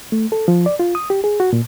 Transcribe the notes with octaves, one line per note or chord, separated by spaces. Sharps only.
A3
A4
F3
D5
F4
D#6
G4
G#4
F#4
A#2